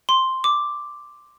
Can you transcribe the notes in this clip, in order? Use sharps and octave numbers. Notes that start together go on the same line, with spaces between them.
C6
D6